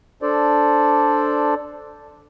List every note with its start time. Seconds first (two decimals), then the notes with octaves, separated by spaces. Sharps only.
0.22 D4 A4 C5 D5